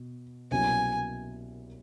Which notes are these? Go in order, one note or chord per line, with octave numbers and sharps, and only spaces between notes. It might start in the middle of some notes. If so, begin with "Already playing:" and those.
Already playing: B2
C2 B2 F#3 A#3 C#4 G#5